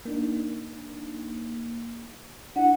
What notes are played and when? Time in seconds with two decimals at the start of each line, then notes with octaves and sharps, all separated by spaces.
0.05 A#3 D4 D#4
2.56 D4 E4 F#5